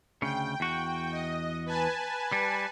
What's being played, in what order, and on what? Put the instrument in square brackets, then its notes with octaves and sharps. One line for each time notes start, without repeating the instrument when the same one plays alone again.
[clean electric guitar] D2 C#3 [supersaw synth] G5
[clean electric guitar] E2 F#4
[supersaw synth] D#5
B4 G#5 A5
[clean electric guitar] G3